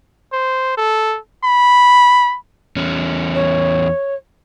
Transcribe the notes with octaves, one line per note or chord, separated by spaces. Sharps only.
C5
A4
B5
E2 C#4
C#5